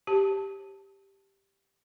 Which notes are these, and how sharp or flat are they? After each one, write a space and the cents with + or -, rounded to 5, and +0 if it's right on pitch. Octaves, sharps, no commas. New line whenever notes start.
G4 +0 C5 +45 A5 +0